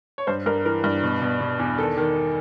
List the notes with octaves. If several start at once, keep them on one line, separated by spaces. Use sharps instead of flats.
C#5
G2 C5
G2 A#4
E3 A#4
G2
B2
B2
B2
E2
D#3 A4
D#3